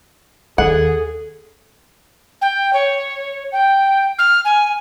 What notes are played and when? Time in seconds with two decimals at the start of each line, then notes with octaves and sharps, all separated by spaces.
0.58 D#2 G#4 A4 F#5
2.41 G5
2.73 C#5
3.52 G5
4.18 F6
4.45 G#5